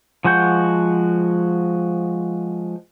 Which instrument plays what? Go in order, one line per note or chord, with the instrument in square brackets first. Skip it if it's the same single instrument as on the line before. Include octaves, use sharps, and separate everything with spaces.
[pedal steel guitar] F3 G#3 F#4 F#5 G6